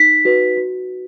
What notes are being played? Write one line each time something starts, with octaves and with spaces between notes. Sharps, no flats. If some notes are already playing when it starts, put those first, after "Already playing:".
Already playing: D#4 B6
F#4 B4
F#4